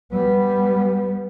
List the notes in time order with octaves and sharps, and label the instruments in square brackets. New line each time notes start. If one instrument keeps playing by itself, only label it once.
[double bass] G3 B3